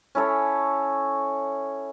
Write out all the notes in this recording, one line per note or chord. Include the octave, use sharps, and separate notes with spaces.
C#4 E4 A4 C#5